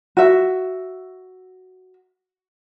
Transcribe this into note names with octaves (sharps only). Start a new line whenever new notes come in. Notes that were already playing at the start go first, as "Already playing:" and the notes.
F#4 E5